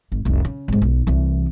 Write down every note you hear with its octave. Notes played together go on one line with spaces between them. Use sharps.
G#1
F1 C2
C#3
G#1 G#2
B1
C2 E3